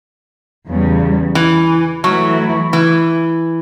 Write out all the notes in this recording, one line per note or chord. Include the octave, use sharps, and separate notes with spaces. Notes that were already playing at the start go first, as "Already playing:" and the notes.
E2 C#3 G3
E3
E3 F#3 A3 E4
E3